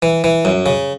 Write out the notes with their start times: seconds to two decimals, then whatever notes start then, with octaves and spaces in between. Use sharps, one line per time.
0.02 E3
0.24 E3
0.45 F#2
0.66 C#3